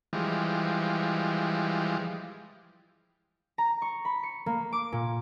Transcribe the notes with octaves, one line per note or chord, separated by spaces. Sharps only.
E3 F3 G3 G#3
A#5
C#6
B5
C#7
A#3
D6
A#2